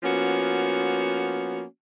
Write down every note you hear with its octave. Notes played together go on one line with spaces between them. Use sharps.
F3 A#3 B3 C#4 F#4